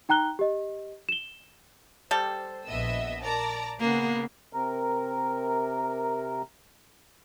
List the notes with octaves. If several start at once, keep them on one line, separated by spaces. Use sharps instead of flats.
D#4 G5 A#5 F#6 G7
G4 D#5
E7 G7
G3 G4 A4 C5
A#1 B3 D#5 E5 E6
A#4 D5 A5 A#5 D6
C#3 A#3 B3 G#4
C3 A#4